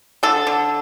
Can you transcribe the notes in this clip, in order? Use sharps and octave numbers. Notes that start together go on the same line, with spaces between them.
D3 A4
D3